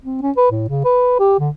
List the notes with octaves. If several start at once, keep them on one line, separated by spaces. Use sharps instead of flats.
C4
C#4
B4
A2
C#3
B4
G4
D3